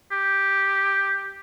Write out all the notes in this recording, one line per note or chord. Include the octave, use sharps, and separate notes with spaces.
G4